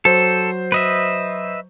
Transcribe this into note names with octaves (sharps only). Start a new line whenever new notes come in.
F#3 A4 C5
B4 D#5 E5